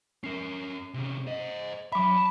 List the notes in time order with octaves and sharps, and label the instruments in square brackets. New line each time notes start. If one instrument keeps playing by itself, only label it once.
[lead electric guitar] C#4 A#4 [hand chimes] C7
[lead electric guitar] C3 C#4
C5 D#5
[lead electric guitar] F#3 E5 [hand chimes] B5 D6
[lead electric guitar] A5